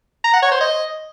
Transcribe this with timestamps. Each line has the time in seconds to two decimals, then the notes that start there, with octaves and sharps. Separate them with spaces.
0.24 A#5
0.33 F#5
0.42 C#5
0.51 C5
0.61 D#5